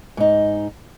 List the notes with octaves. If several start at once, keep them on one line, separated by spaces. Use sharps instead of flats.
G#2 D#4